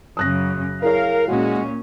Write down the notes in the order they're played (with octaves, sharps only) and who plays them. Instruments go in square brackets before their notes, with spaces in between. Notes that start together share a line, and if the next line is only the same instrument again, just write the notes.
[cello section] F#2 C#3 [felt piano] D#6 F#6 A#6
[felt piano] E4 G#4 C#5 [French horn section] A#4 [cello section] F5
[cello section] A#2 C#4 [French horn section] G#3 F#4